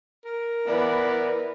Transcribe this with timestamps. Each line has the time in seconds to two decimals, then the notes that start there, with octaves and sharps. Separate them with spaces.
0.25 A#4
0.67 E3 B3 D5